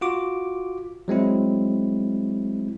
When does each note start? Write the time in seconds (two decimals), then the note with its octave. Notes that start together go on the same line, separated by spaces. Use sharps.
0.01 F4 F#4 D6
1.08 F#3 G#3 C4 E4